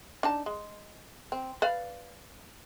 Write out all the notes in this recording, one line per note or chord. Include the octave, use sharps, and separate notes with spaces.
D4 D#4 A5
G#3
C4
B4 D5 F5